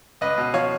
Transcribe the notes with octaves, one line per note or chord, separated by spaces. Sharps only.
C#2 B4 D#5
B2
F3 C#5 F5